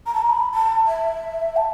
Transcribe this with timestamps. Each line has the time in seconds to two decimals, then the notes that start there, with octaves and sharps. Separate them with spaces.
0.06 A#5
0.14 A5
0.22 A#5
0.30 B5
0.54 A5
0.87 E5
1.57 A5